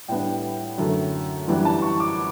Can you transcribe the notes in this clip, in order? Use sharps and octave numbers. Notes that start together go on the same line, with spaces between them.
A2 G3 B3 D4 G5
F#2 D3 A3
F#2 E3 G3 B3 D4
A5
C#6
D6